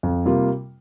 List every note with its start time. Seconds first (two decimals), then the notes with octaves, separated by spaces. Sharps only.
0.03 F2
0.25 C3 G3 A#3 F4